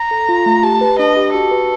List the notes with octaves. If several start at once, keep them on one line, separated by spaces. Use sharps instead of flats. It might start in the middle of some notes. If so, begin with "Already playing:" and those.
Already playing: A#5
A4
F4
A3
G4 A5
B4
D4 D#5
G4
F#4 A4
B4